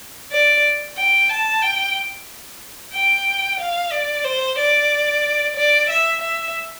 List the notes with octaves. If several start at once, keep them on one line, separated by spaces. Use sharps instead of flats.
D5
G5
A5
G5
G5
F5
D5
C5
D5
D5
E5
E5